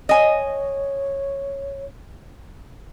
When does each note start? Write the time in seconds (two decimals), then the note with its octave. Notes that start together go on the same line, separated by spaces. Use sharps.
0.09 C#5 D#5 G#5